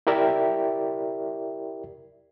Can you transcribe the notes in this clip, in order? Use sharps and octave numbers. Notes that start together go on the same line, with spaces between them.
E4 G4 A#4 D5 E5 G5